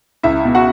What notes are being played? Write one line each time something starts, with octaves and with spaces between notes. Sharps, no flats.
C#2 E4 E5
B2
F#4 F#5